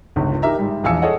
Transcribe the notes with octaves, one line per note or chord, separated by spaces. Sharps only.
G1 C#2 D#3
D#4 G4 A#4 E5 A#5
G#2 G3
A#1 E2 F5 G#5 E6 C#7
G#4 A4 C#5 D#5 F#5